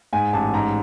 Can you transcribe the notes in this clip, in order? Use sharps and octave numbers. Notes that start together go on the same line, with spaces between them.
G#2 G#5
A1 A5
G#2 A#5